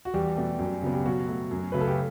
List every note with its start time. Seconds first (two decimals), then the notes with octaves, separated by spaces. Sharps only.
0.05 F#4
0.14 E2 G3 G4
0.36 B2 A3
0.59 F#2
0.82 C#3 F#3 B3
0.94 G4
1.05 B2 F#3 F#4
1.28 A3
1.51 F#2
1.72 C#3 F#3 A3 B4
1.81 A4
1.87 G4